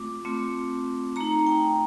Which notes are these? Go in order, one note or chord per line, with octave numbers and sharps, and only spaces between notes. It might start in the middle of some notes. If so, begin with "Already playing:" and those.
Already playing: A3 C4 F4 D6
A3 C4 F4
A3 D#4 A#5
G5